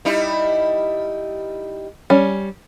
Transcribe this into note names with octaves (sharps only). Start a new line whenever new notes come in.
G3 D#4 E4
G3 C#4